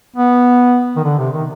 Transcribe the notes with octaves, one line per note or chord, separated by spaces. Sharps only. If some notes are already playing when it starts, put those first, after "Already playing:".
B3
D#3
D3
C3
D#3